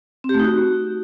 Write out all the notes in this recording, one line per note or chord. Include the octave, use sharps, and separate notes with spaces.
C4
G4
A3
D#4
F#4